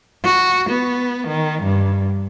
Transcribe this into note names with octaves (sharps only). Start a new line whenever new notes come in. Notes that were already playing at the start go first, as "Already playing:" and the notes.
F#4
B3
D#3
G2